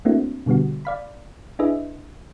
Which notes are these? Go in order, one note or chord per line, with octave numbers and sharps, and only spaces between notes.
A3 A#3 C4 D4 E4 F#4
B2 D3 G3 B3 F#4
D5 F5 B5
D4 E4 G#4 B4 D#5 E5